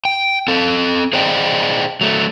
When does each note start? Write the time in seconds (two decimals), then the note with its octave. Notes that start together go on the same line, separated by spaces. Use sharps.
0.05 G5
0.48 C4 A4
1.13 G#4 C5 D5 D#5 G5
2.01 F#3 A3